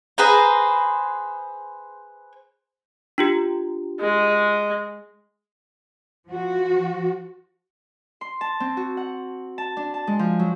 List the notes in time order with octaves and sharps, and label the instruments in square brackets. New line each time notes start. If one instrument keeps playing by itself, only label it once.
[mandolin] G#4 B4 C5 A#5
[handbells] D4 F4 G4
[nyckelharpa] G#3
[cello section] F3 F#4
[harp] C6
A5
C4
F#4
F#5
A5
D4
A5
G#3
F3
F#3